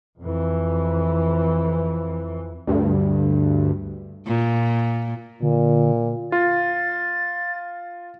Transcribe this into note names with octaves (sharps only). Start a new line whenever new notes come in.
F2 E3
D2 G2
A#2
A#2 D3
F4 A6